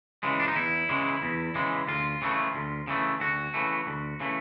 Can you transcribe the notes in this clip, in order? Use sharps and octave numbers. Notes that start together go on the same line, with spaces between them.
C#3 E3 G#3
D4
D#4
E2 E4
C#3 E3 G#3
E2
C#3 E3 G#3
D2 F4
C#3 E3 A3
D2
C#3 E3 A3
D2 F#4
C#3 E3 A3
D2
C#3 E3 A3